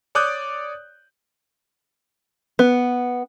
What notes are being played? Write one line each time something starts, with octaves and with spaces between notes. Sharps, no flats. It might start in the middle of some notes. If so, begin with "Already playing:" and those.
C#5 D5 D6 D#6 F#6 G6
B3